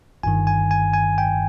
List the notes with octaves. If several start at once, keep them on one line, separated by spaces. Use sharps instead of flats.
G1 G2 D#3 G#5
G#5
G#5
G#5
G5